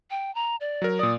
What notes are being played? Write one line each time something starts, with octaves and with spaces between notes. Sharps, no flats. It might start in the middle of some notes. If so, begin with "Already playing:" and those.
G5
A#5
D5
F#3 A#4
A#2 D5 D#6